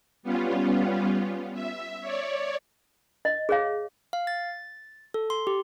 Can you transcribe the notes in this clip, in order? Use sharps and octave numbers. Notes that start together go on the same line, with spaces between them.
G3 B3 C#4 F4
E5
C#5 D5
D#5
G#4 C#5 F5
F5
A6
A4
C6
G4